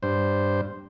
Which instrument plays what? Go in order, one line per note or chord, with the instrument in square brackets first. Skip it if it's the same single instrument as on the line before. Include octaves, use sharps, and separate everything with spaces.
[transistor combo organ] G2 C5